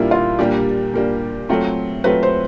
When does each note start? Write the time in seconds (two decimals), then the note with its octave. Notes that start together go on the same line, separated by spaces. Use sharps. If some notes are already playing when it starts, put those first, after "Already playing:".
Already playing: A#2 G3 A#3 D4 E4 F4
0.11 F4
0.39 A#2 G3 A#3 D4 G4
0.94 A#2 G3 A#3 D4
1.49 F#3 A3 C4 F4
2.04 F#3 A3 C4 F4 B4
2.23 C5